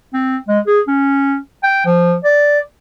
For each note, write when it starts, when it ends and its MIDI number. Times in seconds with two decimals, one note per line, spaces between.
0.14 0.37 60
0.48 0.59 56
0.67 0.80 68
0.87 1.37 61
1.63 1.83 79
1.86 2.15 53
2.24 2.60 74